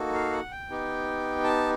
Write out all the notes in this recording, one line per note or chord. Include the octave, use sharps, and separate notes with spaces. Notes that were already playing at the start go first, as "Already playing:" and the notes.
Already playing: A#3 D#4 F#4 A4
F5
F#5
G5
B3 D#4 G4
A5